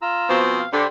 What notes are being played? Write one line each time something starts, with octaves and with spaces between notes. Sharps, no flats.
F4 A#5 E6
B2 F3 C4
F5
D3 G4 C5 B5